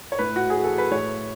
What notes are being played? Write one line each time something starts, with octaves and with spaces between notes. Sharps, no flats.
C#5
A2 B4
F#4
G#4
E3
A4
B4
A2 C#5